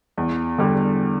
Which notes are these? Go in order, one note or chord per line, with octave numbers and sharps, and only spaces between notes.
E2
D3 G3